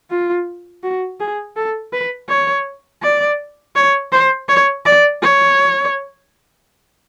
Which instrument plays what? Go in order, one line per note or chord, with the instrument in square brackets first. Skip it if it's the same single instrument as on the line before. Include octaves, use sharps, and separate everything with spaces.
[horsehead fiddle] F4
F#4
G#4
A4
B4
C#5
D5
C#5
C5
C#5
D5
C#5